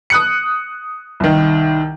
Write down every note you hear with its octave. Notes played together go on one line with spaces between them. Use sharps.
D#6 F#6 C#7
C2 D#3